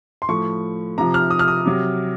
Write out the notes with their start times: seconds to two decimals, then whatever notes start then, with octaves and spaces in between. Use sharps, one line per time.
0.22 C6
0.29 A2 F3 C#6
0.98 C3 F3 A#5
1.14 F6
1.31 D#6
1.39 F6
1.48 D#6
1.66 C3 F#3